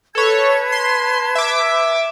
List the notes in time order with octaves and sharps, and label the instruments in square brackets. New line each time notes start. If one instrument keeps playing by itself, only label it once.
[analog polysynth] A4 C#5 [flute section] B4 A5 G#6
[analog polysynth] C6
E5 D6